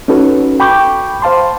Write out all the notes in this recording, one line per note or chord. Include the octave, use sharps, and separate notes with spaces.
C#4 D#4 F#4 A4 B4
G5 B5 C#6 D6 G6
C5 F5 A5 C6